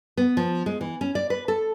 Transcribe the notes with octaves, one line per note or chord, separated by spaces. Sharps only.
B3
F3
G#3
E3
C#4
D5
B4
A4